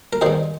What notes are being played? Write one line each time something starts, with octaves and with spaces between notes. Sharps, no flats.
A#4
G2 D#3 G#4 C5